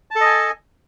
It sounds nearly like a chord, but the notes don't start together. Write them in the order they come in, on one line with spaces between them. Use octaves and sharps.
A5 A4 D#5 G#5